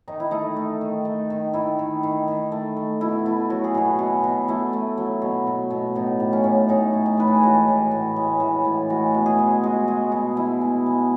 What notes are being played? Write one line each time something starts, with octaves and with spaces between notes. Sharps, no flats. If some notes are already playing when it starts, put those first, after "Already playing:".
D#3 D#4
E4
A3 D#4
A3
D#3
A3
D#3
D#3 E4
D#3
D#3
D#3
A3
A3
B2 E4
A3 E4
F#3 F#4
G#4
B2 F#4
B2
B2
A3 E4
A3
F#3
B2
B2
B2
A2 D#4
A2
C#4
A2
A2 D#4
A2
D#4
G#3 B4
A4
G#4
E3 F#4
A2
A2
G#3
E3
A2
G#3 F#4
B2
G#4
G#3
G#3 F#4
G#3
B2
G#3 E4
B2
G#3